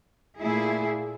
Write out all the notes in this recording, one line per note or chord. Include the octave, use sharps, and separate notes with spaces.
A#2 A3 E4 G#4